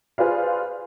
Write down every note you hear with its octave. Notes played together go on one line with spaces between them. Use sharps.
F4 G#4 B4 C5 D5 F5